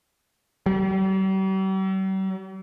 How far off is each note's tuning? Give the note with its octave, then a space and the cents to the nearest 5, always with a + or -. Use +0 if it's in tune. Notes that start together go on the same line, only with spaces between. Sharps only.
G3 -45